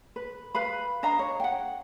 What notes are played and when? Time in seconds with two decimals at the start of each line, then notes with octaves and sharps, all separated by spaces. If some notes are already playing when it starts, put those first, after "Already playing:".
0.16 B4
0.54 B4 F5 B5
1.03 D4 D#5 F5 A#5
1.19 C#5
1.40 F#5 G5